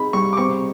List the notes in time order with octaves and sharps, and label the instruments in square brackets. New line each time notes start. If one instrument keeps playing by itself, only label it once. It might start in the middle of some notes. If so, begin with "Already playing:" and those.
Already playing: [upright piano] C4 D#4 G#4 [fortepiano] B5
[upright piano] G3 [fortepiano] C#6
[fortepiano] D6
[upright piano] C4 [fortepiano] C#6